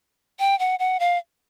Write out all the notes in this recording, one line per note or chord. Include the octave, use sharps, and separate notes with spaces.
G5
F#5
F#5
F5